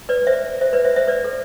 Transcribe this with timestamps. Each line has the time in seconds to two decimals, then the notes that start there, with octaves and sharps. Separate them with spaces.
0.09 B4 D5
0.27 C5 E5
0.61 C5 E5
0.73 B4 D5
0.84 C5 E5
0.96 C5 E5
1.08 B4 D5
1.24 A4